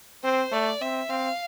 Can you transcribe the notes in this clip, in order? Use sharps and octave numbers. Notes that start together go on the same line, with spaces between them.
C4 C5
A3 D5
C4 E5
C4 F5